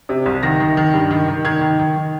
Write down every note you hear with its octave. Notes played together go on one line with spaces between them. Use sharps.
C3
C2
D#3 A#6
D#3
D#3
G2
D#3
D#3
D#3 G#6
D#3
D#3
D#3